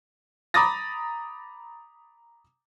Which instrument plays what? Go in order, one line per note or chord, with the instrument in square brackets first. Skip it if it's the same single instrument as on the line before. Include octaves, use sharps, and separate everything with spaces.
[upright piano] A#5 B5 D6 D#6 A6 A#6